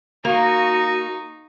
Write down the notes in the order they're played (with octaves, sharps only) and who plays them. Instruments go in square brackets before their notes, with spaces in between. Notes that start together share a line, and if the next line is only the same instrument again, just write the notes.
[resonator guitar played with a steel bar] A#3 [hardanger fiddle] D#4 C#6 [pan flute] F#4 [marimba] F5